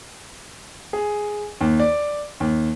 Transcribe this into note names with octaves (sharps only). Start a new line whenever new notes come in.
G#4
D#2
D5
D#2